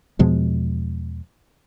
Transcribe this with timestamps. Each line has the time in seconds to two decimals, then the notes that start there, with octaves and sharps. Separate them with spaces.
0.19 E2 B2 F3 G#3